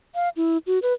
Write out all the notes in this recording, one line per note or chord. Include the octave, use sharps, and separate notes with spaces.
F5
E4
F#4
B4